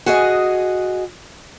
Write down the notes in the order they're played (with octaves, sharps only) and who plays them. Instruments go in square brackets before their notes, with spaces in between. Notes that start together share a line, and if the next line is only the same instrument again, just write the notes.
[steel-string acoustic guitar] F#4 G#4 D#5